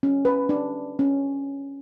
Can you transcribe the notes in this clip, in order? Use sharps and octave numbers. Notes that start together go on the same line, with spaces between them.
C#4
B4
D4
C#4